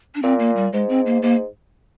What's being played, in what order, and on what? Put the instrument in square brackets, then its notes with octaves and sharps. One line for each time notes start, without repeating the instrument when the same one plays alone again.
[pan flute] D4
[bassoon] A#2 [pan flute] C4
[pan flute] A#3
G3
[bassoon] G#2 [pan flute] G#3
[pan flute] C4
A#3
[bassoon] G#2 [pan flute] A#3